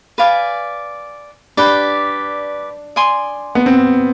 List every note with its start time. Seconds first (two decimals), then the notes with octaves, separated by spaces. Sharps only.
0.18 B4 D5 F5 G#5
1.57 D4 G4 B4 D5
2.96 D5 G#5 C6 D#6
3.55 B3
3.66 C4